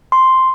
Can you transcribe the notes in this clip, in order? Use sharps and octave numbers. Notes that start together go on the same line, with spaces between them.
C6